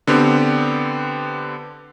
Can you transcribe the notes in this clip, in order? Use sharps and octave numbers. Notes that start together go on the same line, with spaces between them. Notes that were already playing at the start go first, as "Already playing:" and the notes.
D3 B3 C4 G4